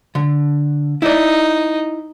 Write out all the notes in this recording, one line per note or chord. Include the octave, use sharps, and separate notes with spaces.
D3
D#4 E4 D5